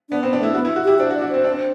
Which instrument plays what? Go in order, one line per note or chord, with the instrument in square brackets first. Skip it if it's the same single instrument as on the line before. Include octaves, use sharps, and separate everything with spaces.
[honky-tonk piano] B3 [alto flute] D4
[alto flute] B3 [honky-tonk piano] C4
[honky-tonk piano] D4
[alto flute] A3 [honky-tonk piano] E4
[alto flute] B3 [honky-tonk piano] F#4
[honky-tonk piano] E4
F#4
[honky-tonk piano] E4 [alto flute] G4
[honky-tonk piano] D4 [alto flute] C5
[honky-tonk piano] F#4
[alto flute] D5
[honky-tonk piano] F#4
[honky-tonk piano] C4 [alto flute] C5
[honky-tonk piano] D4
C4